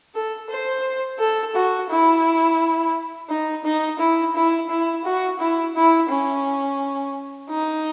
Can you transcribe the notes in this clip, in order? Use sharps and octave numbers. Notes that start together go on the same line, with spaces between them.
A4
C5
A4
F#4
E4
D#4
D#4
E4
E4
E4
F#4
E4
E4
C#4
D#4